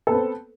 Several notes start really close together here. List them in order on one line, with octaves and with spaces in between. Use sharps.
A4 B3 B4 C4